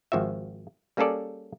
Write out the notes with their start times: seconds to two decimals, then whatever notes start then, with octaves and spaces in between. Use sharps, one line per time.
0.12 G#1 F3 F#4 E5
0.97 G3 A#3 C#4 G#4 A4 D5